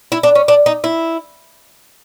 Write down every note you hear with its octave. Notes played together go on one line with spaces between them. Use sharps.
E4
D4
C#4
D4
D#4
E4